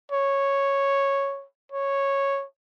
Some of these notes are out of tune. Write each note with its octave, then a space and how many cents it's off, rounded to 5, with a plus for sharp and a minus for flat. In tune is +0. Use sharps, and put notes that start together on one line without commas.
C#5 -5
C#5 -5